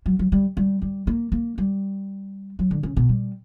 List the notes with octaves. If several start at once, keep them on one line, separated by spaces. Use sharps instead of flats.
F#3
F#3
G3
G3
G3
A#3
A#3
G3
F#3
D3
C#3
B2
G3